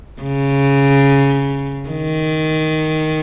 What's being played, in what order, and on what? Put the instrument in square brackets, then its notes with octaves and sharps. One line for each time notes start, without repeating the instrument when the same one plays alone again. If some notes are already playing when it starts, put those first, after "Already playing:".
[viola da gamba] C#3
D#3